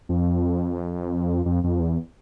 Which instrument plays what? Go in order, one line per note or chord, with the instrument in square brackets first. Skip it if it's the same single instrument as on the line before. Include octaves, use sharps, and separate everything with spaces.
[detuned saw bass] F2
F2
F2
E2